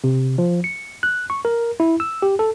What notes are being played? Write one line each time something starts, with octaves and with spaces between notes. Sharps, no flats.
C3
F3
C#7
F#6
C#6
A#4
E4
E6
G4
A4